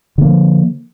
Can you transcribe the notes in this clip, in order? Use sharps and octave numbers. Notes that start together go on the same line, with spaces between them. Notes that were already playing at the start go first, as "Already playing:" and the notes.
D3 F3 A#3